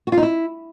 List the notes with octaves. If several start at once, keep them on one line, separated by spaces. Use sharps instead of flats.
F#4
F4
D#4
E4